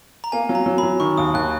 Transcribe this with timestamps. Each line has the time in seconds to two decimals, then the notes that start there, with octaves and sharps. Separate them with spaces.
0.24 A#5
0.32 A#3 G#5
0.49 F#3
0.55 A#5
0.66 F#3
0.78 B5
0.83 F#3
1.00 D#3 C#6
1.18 D#2 D#6
1.34 D#2 F#6